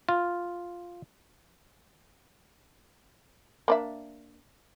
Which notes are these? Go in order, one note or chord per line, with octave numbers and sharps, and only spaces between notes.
F4
A#3 D4 E5